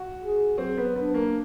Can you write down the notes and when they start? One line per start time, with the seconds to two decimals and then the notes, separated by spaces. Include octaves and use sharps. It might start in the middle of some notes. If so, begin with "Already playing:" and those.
Already playing: F#4
0.21 G#4
0.58 F#3 C4
0.77 B3
0.96 B3 D4
1.14 A#3